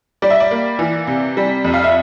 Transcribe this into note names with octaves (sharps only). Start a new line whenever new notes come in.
G3 D5
E5
D5
A#3
E3
C3
G3
F2
F5
E5